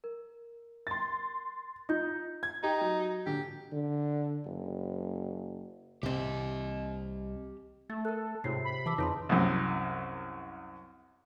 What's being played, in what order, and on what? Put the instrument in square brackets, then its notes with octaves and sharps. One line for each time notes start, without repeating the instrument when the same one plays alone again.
[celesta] A#4
[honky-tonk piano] C6 A6
[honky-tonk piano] D#4 [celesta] F4 G6
[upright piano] G#6
[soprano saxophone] D#4 [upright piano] G4
[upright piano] F#3
[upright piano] A#1 D3 [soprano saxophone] G4
[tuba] D3
F#1
[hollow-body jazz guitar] C2 C3 [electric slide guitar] G4 D#5
[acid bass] A3 [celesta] A6
[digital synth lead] A4 [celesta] A#4 F#6
[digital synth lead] G#2 [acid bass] C3 [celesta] F4 C#5 C7
[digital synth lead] B5
[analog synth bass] E3 [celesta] A5 D6 E6
[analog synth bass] F2 [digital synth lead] C#3 [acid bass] D#4 [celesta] B4 A5 C6
[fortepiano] C2 F#2